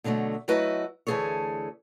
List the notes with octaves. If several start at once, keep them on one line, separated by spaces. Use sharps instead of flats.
B2 D3 F#3 G#3 A3
F#3 A3 E4 F#4 B4 D#5
D2 E3 A3 G#4 A4 C#5